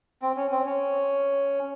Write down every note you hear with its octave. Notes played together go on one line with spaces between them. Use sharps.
C4
C#4
C4
C#4